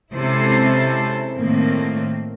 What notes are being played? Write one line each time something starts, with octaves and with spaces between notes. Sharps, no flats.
C3 G#3 C#4 E4 A4 C5
A2 D#3 A3 A#3 C4